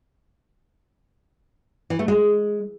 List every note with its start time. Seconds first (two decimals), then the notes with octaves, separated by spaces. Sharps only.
1.90 E3
1.99 A3
2.08 G#3